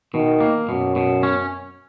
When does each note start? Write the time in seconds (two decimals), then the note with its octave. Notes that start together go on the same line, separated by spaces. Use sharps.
0.14 B2 D#3
0.40 A#3
0.69 F#2 B2
0.96 B2
1.23 C#4